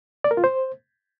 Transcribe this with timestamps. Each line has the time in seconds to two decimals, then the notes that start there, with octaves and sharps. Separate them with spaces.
0.24 D5
0.31 A#4
0.37 F4
0.44 C5